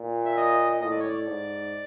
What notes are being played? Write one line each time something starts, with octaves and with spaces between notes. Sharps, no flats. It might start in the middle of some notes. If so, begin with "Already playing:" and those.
Already playing: A#2
E5
D#5
A2 D#5
D5
C#5
D5
G#2